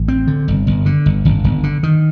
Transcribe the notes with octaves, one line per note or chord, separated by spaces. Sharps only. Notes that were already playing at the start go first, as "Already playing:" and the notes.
Already playing: A1
C4
D3
G1
G1
D3
G1
G1
G1
D3
D#3